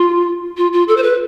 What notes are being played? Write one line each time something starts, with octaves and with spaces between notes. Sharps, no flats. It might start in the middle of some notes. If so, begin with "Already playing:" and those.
Already playing: F4
F4
F4
A4
C5
B4